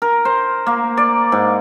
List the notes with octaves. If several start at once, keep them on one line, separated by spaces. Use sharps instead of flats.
A#4
C5
A#3
D5
G#2